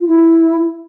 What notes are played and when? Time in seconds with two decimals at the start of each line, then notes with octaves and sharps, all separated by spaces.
0.01 F4
0.07 E4